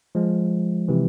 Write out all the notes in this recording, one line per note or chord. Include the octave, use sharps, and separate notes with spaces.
F3 G#3
C3 E3